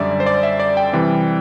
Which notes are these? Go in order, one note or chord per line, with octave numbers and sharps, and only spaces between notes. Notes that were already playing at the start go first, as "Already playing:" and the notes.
Already playing: F#2 D3 G3 D5 E5
C5
D5
E5
D5
G5
C3 E3 G3